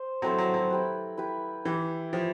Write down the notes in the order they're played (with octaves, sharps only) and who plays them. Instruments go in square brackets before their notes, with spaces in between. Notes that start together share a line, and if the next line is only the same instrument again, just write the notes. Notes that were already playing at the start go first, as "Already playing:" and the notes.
Already playing: [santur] C5
[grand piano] F#3 [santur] C4 E4 A4 C5
[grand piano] F#3
F#3
[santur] E4 G4 B4
E4 G4 B4
[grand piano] E3 [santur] E4 G4 B4
[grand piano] F3 [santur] E4 G4 B4